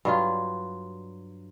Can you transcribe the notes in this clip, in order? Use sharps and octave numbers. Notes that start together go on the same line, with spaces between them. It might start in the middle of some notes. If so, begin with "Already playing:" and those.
G2 F#3 F4